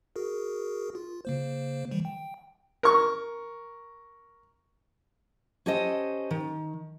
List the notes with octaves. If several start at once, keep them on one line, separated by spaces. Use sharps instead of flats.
F#4 G#4 A#4
F4
C#3 A#3 C5
D#3 E3 G3
G5
A#4 C#6
C#4 G4 A4 C5 D#5
D#3